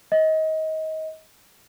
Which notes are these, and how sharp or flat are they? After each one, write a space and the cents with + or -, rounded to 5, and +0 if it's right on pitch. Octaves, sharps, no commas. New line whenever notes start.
D#5 +25